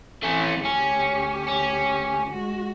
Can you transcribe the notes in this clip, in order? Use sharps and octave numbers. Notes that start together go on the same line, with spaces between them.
E3 A3 C4 C#4
D2 C#4 G4
C#4
G#3 F#4